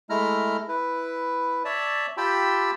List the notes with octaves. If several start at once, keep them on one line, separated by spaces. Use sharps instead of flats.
G#3 A3 E4 A#5 F6
E4 B4
C#5 D5 E5 A5
F4 G4 G5 A5 B5 E6